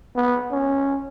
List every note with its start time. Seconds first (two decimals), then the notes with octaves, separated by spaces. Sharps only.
0.16 B3
0.52 C#4